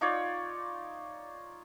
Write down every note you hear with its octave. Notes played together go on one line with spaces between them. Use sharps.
D#4 F4 C#5 D5